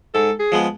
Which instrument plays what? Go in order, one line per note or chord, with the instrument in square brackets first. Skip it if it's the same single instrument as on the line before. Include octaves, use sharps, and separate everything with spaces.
[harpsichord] G#2 [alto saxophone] A4
[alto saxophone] G#4
[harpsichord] F3 G#3 B3